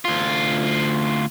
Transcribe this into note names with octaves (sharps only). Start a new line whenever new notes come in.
D2 F4